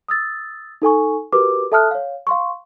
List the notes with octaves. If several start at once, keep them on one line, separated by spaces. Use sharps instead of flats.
D#6 E6 A6
D#4 A4 G#5 C#6
F#4 G4 A#4 B4 D6
A4 E5 A5 D#6 F6 F#6
C#5 F5
F5 C6 C#6